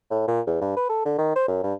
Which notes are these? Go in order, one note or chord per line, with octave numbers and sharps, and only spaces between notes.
A2
A#2
E2
G2
B4
A4
D3
D#3
C5
F#2
G2